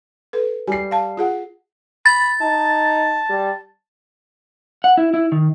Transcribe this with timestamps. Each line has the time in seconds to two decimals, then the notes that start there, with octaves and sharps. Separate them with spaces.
0.33 A4 B4
0.67 G3 G#5 C7
0.91 F5 A5
1.17 F4 G#4 F#5
2.06 B5 A6
2.41 D#4 A5
3.29 G3
4.84 F#5
4.97 E4
5.14 E4
5.32 D#3